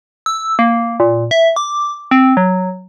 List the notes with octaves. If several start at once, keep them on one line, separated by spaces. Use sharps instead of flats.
E6
A#3
A#2
E5
D6
C4
F#3